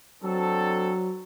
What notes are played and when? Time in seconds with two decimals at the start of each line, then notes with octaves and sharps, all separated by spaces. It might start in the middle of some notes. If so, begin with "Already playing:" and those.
0.24 F#3 C4 D4 A4